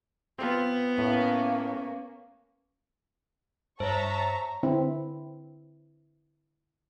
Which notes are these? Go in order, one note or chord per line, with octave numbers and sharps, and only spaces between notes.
B3 C4 F4
A2 A#3 C#4
G2 C5 C#5 E5 A5 A#5 C#6
D3 C4 E4